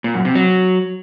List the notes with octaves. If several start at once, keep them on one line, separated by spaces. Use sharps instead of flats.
A#2
F#2
C3
F#3